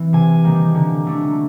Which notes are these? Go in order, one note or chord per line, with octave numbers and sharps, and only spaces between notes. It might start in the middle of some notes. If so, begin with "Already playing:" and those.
Already playing: E3 C4
C3 G#5
D#3 G3 A#3
D3
F#3 A3 D4